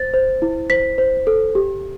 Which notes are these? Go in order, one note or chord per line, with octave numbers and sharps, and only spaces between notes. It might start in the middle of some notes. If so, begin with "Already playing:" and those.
Already playing: C5 A6
C5
E4
C5 B6
C5
A4
G4